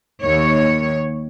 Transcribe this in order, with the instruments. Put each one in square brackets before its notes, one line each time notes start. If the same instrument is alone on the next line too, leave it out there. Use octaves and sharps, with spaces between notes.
[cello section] D#2 C#5